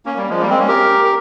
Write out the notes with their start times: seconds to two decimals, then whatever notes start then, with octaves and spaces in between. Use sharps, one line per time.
0.06 A#3 C#4
0.17 G3 A#3
0.29 F3 G#3
0.41 G3 A#3
0.49 G#3 C4
0.58 A#3 C#4
0.68 G4 A#4
1.05 A#4